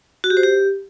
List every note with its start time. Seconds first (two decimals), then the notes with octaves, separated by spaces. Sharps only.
0.24 F#4
0.30 G4
0.37 C5
0.43 G4